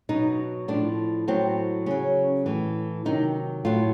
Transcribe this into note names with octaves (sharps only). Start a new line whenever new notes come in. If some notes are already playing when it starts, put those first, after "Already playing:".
B2 F#3 D#4
A2 F3 D4
A2 F#3 C4
C#3 F#3 C#4
A2 E3
C3 D#3 F#3 D#4
A2 F#3 F4